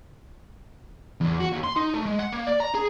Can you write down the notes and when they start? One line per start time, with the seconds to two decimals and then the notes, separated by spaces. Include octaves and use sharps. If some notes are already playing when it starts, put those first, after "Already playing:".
1.21 E2
1.40 F#4
1.52 D#2
1.64 C6
1.76 D#4
1.94 A3
2.06 G#3
2.19 F#5
2.32 A#3
2.47 D5
2.60 A#5
2.75 G#4